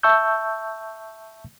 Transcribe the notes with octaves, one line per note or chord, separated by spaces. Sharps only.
E5 A5 C#6 E6 G6